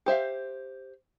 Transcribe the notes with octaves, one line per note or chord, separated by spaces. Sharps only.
G4 C5 E5 F5